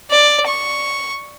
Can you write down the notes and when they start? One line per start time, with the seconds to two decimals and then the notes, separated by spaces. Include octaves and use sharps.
0.11 D5
0.47 C#6